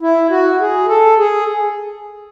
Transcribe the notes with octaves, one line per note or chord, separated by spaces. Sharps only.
E4
F#4
G#4
A4
G#4